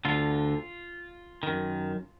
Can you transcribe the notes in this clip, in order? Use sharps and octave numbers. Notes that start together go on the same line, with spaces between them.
D2 D3 F4
F#2 D#3